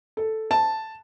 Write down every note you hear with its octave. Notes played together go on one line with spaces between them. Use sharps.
A4
A5